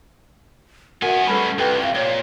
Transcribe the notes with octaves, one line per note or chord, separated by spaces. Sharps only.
B3 F#4 A#4 E5 F#5 G#5
G3 A3 C#4 A4 B4 B5
C2 F4 G4 A4 B4
F5
A#2 C#5